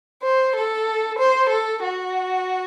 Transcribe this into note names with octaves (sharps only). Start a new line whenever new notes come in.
C5
A4
C5
A4
F#4